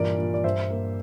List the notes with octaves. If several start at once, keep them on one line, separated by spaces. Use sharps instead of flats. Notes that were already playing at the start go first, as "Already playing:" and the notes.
Already playing: G2 A#2 E3 A#4 D5
A#2
D5
G2 C5 E5
A#3